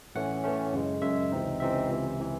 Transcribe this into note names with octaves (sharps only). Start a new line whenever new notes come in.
A2 E3 A3 C#4 F#5
A2 E3 A3 C#4
F#2 C#3 G#3
F#2 C#3 G#3 E5
C#2 C3 E3 C4 D#4
C#2 C3 E3 C4 D#4 E5
C#2 C3 E3
C3 E3